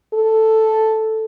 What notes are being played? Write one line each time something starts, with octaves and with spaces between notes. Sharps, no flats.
A4